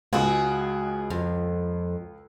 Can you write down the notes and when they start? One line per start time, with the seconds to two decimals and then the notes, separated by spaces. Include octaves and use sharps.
0.13 C#2 G#3 F#4 G#4
1.10 F2